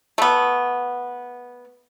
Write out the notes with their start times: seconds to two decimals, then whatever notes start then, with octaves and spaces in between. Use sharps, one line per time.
0.18 A3 B3